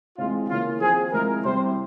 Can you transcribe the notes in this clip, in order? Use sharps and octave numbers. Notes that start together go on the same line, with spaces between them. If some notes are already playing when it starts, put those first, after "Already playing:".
C3 E3 G#3 F4
C#3 E3 A#3 F4
F3 C4 F4 G#4
C3 F3 G#3 E4 A#4
C3 G3 C4 E4 C5